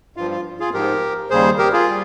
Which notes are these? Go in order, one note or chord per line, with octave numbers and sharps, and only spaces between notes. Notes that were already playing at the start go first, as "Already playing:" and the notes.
G2 F3 F4
F4
F4 G#4
G#2 F3 G4 A#4
D#2 C#3 G3 G#4 C5
G4 A#4
F4 G#4
G3